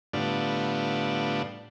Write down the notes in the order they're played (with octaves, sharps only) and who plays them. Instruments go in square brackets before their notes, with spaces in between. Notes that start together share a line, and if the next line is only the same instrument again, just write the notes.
[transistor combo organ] A2 D3 G3 B3 D4 F4